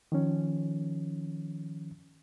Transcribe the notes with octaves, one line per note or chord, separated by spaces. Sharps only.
D#3 F3 C#4